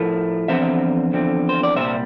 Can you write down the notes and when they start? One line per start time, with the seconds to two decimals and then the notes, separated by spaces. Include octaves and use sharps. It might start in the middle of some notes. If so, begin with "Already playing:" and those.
Already playing: A2 F3 A3 A#4
0.48 E2 D3 F3 C4 C5 E5
1.12 E2 D3 F3 C4
1.49 C5
1.63 D5
1.76 C2 A#2 G3 C5 E5